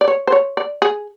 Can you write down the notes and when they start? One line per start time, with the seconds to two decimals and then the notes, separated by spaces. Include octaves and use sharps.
0.01 D5
0.08 C#5
0.27 C5
0.32 C#5
0.57 D5
0.82 G#4